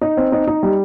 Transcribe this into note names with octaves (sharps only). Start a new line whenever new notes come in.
D#4
C4
D#4
D#4
G3